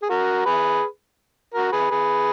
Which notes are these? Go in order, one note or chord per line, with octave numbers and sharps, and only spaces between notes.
G#4
F#4 A#4
G#4 B4
F#4 A#4
G#4 B4
G#4 B4